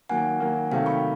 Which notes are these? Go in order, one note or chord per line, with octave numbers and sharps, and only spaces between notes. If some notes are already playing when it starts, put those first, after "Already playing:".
D#3 F#3 A#3 F#5 G#5
D#3 F#3 A#3
C3 D#3 F#3 A3 F5 G5
B5 C#6